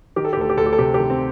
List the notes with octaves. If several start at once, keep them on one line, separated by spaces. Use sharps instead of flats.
D#3 G4
A4
G4
D2 A4
G4
D2 A4
G4
A4
C3 G4
G4
D#3
C4